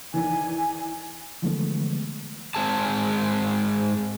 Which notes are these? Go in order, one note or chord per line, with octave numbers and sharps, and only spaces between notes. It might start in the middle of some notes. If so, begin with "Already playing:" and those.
E2 D#3 E3 G#5
D3 E3 F3 G#3 A3 B3
G#2 G#3 C4 G#4 A5